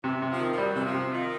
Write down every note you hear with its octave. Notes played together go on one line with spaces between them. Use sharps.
C3 E3
C3
F3
D#3
F3
F#3 G3
C3 E3
F3
C3
D#3 F4